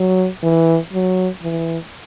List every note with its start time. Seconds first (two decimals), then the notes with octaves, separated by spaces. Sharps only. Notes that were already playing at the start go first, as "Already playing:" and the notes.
Already playing: F#3
0.43 E3
0.93 F#3
1.43 E3